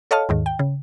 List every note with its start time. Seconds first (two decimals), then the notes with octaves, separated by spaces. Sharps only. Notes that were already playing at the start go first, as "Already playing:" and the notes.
0.11 A4 C#5 D#5 F5 A5 F6
0.29 D#2 G#2 D#3
0.46 G5
0.59 C#3